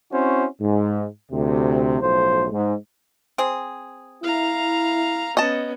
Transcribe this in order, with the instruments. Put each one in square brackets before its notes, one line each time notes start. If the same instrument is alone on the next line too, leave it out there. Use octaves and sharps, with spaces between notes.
[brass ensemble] C4 C#4 E4 F#4 C5
G#2
D2 C3
B1 A2 F3 C5
G#2
[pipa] C4 G#4
[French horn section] E4 [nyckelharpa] F5 A#5
[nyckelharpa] B3 C#4 [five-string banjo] D#5 A5